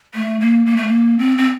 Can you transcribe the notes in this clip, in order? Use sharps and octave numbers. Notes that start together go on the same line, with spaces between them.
A3
A#3
A#3
A3
A#3
C4
C4